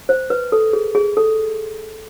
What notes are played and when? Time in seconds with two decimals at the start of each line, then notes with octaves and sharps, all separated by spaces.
0.09 C5
0.30 B4
0.52 A4
0.73 G#4
0.95 G#4
1.17 A4